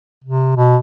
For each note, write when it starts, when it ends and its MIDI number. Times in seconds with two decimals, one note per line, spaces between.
0.24 0.56 48
0.56 0.77 47